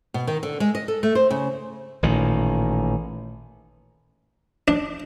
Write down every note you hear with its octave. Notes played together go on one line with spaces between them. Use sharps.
B2
D#3
D3
G#3
D#5
A4
A3
C5
C#3
A1 A#2 D#3
D4